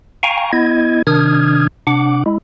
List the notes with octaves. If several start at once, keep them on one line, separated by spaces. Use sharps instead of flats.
F5 G5 G#5 A#5 C#6
B3 E4 D#5 G#6
C3 D#3 D4 D#6 F6 G#6
C3 D4 F#5 D6
G#3 E4